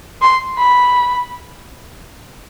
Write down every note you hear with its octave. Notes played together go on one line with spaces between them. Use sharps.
C6
B5